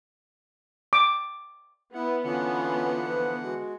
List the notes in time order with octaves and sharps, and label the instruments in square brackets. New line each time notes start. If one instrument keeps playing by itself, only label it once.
[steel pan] D6
[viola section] B3 [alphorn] E4 [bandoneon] F#5
[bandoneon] D3 E3 F#5 [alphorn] C#4 [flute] F4
[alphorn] F3 [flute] B4
[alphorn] G#3 [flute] F#4